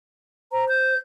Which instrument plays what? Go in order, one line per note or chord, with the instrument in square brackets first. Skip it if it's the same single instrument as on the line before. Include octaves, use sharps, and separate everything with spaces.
[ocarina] C5 [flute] A#5
[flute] G6